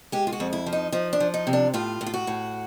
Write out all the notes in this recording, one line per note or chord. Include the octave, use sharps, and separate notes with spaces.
G#3 G4
F4
F#4
F2
E4
F3
D#4
F3 D#4
D4
F3
D#4
C3
D4
A2 F4
A2
F4
F#4
A2